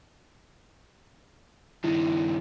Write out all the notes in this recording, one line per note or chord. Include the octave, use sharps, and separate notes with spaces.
G2 D#3 E4